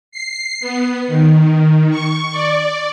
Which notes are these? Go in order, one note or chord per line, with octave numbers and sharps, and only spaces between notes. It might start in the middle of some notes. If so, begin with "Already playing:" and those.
C7
B3
D#3
C#6
D5